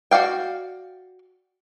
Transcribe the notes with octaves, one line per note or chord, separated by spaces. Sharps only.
F#4 D5 F5 G5